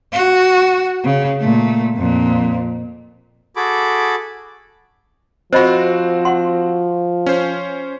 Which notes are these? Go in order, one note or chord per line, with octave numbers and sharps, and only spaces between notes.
F#4
C#3
A#2 A3
F2 A#2
F#4 G#4 A4 B5 D6
F3 C4 F#4 C5 D#5 B5
F#5 C6
C#4 C5